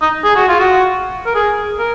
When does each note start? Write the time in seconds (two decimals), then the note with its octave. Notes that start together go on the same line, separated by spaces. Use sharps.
0.01 D#4
0.24 G#4
0.36 F#4
0.48 F4
0.59 F#4
1.26 A#4
1.35 G#4
1.79 A#4